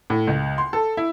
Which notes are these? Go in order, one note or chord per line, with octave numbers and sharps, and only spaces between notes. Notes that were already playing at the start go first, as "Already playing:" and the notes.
A2
C#2
C6
A4
E4